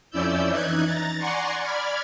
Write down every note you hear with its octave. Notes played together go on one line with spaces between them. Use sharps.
F2 C#4 E4 D5 E6 G6
E3 D#4 F#6 G#6
A#5 A6
D5 F#5 G#5 A#5 C6 C#6
D5 B5 F6 G#6